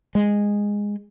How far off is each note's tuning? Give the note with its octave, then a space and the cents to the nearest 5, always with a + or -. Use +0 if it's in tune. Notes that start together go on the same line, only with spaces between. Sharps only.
G#3 -10